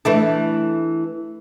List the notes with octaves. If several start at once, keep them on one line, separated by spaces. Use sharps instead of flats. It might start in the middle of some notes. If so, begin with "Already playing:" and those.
E3 A3 D4